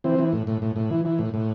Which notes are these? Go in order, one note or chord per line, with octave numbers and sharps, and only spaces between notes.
E3 C4
E3
A2
A2
A2
A2
E3
E3
A2
A2